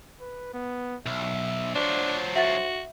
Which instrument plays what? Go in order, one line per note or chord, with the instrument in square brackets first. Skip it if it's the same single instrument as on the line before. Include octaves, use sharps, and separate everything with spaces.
[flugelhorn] B4
B3
[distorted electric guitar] B1 [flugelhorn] E5
[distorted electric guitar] F#3 F4 [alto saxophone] D4 [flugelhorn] C5
[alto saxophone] F#4 [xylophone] E5 F#5 A6